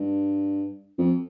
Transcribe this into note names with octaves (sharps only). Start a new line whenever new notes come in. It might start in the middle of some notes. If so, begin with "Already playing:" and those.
Already playing: G2
F2